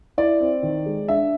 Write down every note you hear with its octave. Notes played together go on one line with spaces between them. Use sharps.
E4 D5
C4
D#3
G#3
D4 E5